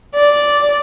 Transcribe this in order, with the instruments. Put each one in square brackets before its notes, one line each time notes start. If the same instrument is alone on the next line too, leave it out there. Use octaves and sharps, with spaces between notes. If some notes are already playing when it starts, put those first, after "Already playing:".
[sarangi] D5